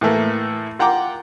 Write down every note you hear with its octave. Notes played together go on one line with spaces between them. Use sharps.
A2 E3 A3 A#3
F4 F#5 G5 A#5 D6